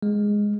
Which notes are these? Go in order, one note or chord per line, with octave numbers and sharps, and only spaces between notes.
G#3